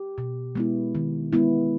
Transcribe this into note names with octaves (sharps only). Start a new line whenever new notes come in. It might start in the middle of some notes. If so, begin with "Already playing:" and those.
Already playing: G4
B2
G#3 B3 E4
D#3
G#3 B3 E4